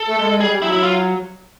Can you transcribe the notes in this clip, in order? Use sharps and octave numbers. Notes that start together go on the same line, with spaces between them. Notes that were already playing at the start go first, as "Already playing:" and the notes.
Already playing: A4
A3
G#3
G#3
G3 G#4
G3
F#3 E4
E4
F4